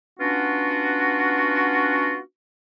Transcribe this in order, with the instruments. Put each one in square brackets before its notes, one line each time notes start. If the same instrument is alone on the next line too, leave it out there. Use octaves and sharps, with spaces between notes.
[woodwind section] B3 C#4 D4 F4 F#4